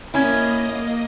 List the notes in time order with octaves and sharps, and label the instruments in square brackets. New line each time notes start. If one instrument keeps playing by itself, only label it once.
[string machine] A#3 D#5 [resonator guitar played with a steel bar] C#4 E4